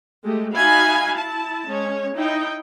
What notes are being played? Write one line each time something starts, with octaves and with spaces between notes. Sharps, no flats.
G#3 A3 G4
D#4 F#4 E5 F5 G#5 B5
E4 A5
G#3 C#4 C#5
D#4 E4 G5